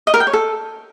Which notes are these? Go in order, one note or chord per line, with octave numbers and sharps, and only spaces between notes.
D#5
A#4
G5
C#5
A4